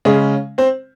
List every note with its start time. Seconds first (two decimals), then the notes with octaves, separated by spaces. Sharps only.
0.05 C#3 G#3 C#4 G#4
0.58 C4 C5